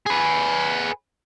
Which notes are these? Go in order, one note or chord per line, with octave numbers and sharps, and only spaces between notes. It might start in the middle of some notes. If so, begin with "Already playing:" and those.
G#4 B4